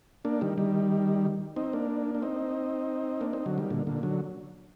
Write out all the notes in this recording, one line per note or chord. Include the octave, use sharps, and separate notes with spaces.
A#3 D4
D#3 G3
D#3 G3
C4 D#4
A#3 D4
D4
C4 D#4
A#3 D4
C4 D#4
D3 F#3
D#3 G3
A#2 D3
A#2 D3
D3 F#3